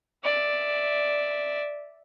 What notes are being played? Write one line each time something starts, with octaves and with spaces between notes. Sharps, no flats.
D5 E5